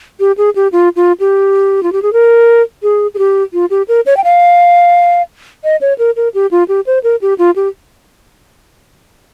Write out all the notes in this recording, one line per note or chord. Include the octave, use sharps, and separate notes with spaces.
G4
G#4
G4
F4
F4
G4
F4
G4
G#4
A#4
G#4
G#4
G4
F4
G4
A#4
C#5
G5
F5
D#5
C#5
A#4
A#4
G4
F4
G4
C5
A#4
G4
F4
G4